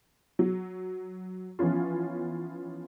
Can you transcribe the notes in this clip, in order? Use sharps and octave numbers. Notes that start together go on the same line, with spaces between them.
F#3
E3 F3 B3 C#4 F4